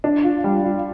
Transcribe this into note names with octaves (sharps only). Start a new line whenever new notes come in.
D4
F4
G3
F4